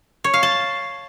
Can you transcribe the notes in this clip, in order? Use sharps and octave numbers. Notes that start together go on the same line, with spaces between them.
C#5
F5
A5